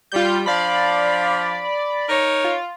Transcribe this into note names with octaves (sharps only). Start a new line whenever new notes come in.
G3 F4 G6
F3 D4 D5 F5 B5
D#4 A#4 C#5
F4